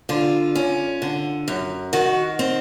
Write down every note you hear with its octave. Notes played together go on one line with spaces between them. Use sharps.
D3 F4
C#4
D3
F#2
D#3 F#4
C4